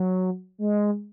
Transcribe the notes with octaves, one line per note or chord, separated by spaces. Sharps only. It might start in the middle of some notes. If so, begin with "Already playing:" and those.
Already playing: F#3
G#3